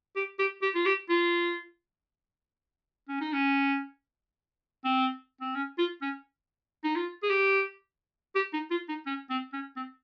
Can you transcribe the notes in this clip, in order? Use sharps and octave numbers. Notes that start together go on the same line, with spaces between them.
G4
G4
G4
F4
G4
F4
C#4
D#4
C#4
C4
C4
C#4
F4
C#4
D#4
F4
G#4
G4
G4
D#4
F4
D#4
C#4
C4
C#4
C4